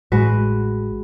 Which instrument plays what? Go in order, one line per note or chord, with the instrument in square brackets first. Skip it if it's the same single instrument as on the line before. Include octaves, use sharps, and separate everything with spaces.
[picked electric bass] A1 A2 [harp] G#3 F#4 B4